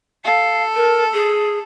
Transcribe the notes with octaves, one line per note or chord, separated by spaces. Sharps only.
A4 F5
A#4
G#4